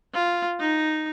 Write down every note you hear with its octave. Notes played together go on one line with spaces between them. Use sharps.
F4
D#4